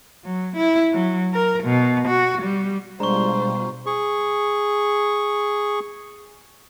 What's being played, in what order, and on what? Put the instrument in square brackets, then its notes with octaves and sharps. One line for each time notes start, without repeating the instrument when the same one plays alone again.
[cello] F#3
E4
F#3
A#4
B2
F#4
G3
[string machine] B2 G3 F4 [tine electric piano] G#3 D4 [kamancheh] C5 [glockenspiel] A#5 C#6
[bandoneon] G#4 C#6